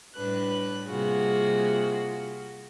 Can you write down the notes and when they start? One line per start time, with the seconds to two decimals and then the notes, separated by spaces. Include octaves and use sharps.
0.16 A2 G3 D4 B4 F#6
0.87 C3 G3 A#3 F4 F#4 G#4